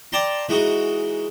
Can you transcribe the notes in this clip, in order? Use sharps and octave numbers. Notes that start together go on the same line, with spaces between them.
D5 G5 A5 A#5 C6
E3 G#3 D#4 F#4